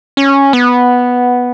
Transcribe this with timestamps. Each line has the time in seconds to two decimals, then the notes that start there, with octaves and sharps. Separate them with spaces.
0.17 C#4
0.53 B3